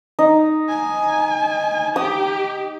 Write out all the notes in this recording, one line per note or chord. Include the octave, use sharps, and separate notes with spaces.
D#4
G#5
G4 D#6